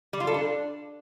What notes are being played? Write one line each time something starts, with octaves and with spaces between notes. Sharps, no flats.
G3
F4
A4
D4